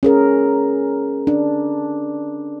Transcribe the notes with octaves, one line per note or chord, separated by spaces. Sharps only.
C#4 G#4 A#4
D4